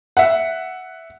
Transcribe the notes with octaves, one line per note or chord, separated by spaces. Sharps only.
E5 F#5